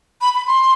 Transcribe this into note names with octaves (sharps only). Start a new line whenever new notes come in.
B5
B5
C6